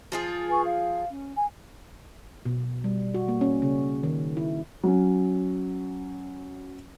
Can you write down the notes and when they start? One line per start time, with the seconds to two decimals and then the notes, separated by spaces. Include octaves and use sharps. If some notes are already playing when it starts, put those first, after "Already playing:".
0.12 F3 F4 G#4
0.50 B4 G#5 C#6
0.64 F5
1.09 C#4
1.35 G#5
2.45 B2
2.84 G3
3.14 F#4
3.28 A#3
3.41 C#4
3.62 C#3
4.03 D#3
4.37 E4
4.83 F#3 C#4